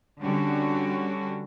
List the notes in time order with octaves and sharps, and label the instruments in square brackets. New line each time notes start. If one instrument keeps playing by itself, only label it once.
[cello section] D3 G3 C#4 F#4